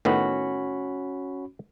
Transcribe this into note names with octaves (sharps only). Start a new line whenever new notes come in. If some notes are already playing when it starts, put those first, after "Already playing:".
A2 D#3 B3 C#4 F#4 B5